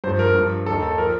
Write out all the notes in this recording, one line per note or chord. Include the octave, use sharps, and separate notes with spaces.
G2 F3 C5
A#4
G2 F3
D#2 D#3 A4
A4
F3 A#4